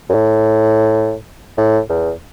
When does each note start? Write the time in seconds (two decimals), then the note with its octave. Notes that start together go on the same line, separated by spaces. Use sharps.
0.09 F#2
0.14 A2
1.58 A2
1.89 E2